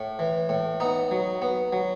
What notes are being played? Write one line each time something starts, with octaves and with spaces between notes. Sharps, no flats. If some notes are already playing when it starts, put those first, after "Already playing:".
Already playing: A2
E3
A2
B3 D#4
F#3
B3
F#3